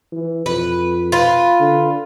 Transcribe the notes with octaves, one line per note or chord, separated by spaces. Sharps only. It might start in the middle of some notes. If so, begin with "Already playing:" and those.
E3
F2 B4
F4 B4
D3